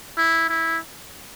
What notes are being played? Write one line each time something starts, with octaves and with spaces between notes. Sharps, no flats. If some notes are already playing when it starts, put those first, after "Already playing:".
E4
E4